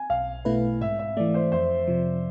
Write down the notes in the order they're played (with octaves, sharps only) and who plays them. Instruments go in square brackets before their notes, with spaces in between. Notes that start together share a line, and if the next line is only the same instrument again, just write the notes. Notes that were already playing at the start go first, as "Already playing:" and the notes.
Already playing: [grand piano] G#5
[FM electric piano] B1 [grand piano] F5
[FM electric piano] B2 A3 E4 B4
[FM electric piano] G#2 [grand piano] E5
[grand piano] E5
[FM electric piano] E3 A3 [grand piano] D5
[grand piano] C5
[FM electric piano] F2 [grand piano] C5
[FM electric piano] C3 F3